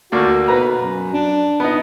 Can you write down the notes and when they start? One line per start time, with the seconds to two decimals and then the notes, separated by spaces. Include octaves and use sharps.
0.12 D2 A#3 F#4 D5
0.48 B2 B4 A#5
0.77 F#2
1.13 D4
1.60 B3 D#4